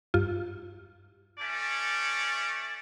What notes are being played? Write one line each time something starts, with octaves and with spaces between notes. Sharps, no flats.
G2 F4
A3 C#4 D5